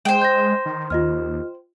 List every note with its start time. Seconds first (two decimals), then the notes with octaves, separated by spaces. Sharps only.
0.05 G#3 C5 G5
0.22 G6 A#6
0.66 D#3
0.90 D#2 F4 D#5 F6